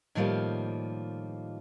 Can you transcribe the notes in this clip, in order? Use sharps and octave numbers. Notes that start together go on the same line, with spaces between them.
A2 D#3 F3 G3 A#3 F4